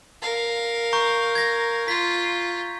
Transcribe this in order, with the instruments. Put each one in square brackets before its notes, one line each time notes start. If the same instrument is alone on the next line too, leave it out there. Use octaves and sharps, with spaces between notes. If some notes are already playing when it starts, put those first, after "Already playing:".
[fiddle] A#4 F5
[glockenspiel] A#5 C#6 G6
G#6 A#6
[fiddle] F4 [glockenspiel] B6